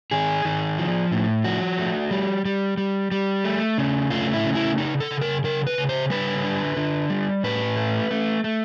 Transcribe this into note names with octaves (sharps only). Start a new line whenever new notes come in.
D#3 G#4
D#3
F3
A2
F3 F#4
A3
G3
G3
G3
G3
A3
C#3
A3 F4
E4
C#3
E4
C#3 D#4
A4
C#3
A#4
C#3 A#4
B4
C#3
C5
G3 B4
D3
D3
G3
A2 B4
A3
A3
A3